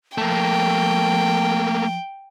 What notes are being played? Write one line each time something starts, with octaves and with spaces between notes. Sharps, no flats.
F3 A3 A#3 G5